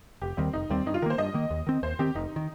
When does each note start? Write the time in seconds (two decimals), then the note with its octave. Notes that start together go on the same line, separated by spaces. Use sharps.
0.22 F1 G4
0.37 D#2 D#3 G3 C4
0.53 F1 D#4
0.70 D#2 D#3 G3 C4
0.86 G2 D#4
0.94 F4
1.02 D#3 A#4
1.06 A#3 C5
1.18 G2 D#5
1.34 D#3 A#3
1.50 D#2
1.67 D#3 C4
1.83 D#2 C5
1.99 D#3 C4 G4
2.15 F1 D#4
2.36 D#3